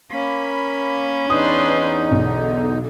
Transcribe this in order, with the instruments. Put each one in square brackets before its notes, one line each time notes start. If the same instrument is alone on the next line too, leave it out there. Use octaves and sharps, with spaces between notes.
[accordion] A#3 B5 [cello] C#4
[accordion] E2 D#4 [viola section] D4 B4 C6 [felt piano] D#6
[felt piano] B1 [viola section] D3